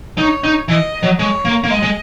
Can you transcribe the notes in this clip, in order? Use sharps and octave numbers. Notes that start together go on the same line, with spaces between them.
D#4 C#5
D#4
E3 D#5
F#3
G#3 C#5
A#3
A#3
G#3 D#5
G#3